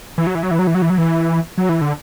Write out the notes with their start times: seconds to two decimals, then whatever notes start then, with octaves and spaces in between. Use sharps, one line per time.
0.18 E3
0.27 F#3
0.35 E3
0.43 F#3
0.51 E3
0.59 F#3
0.67 E3
0.75 F#3
0.82 E3
0.90 F#3
0.98 E3
1.58 F#3
1.69 E3
1.81 D3